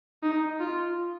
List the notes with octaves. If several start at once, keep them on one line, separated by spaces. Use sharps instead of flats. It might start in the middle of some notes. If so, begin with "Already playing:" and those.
D#4
F4